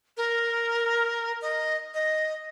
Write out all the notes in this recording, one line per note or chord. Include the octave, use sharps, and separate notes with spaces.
A#4
D#5
D#5